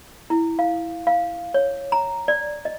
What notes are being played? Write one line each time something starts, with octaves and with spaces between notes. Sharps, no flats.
E4
F5
F5
C#5
A#5
D5
D#5